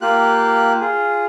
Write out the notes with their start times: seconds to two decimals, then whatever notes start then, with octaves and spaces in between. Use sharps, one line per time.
0.01 A#3 F4 G4 F#6
0.81 F4 G#4